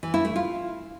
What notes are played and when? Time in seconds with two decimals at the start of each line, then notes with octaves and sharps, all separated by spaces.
0.03 E3
0.14 E4
0.25 A3
0.36 F4